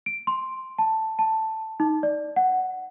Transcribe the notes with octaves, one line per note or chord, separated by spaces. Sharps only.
D7
C6
A5
A5
D#4
D5
F#5